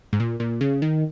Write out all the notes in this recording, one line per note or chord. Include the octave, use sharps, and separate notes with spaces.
G#2
A#2
A#2
C#3
D#3